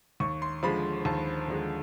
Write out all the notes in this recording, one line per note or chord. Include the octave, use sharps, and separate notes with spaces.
D#2 C#6
C6
D3 F3 G#3 B5
D#2 A5
D3 F3 G#3